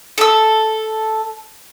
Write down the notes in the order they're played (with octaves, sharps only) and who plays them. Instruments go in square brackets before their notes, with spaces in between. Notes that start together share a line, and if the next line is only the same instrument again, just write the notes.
[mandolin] A4 E6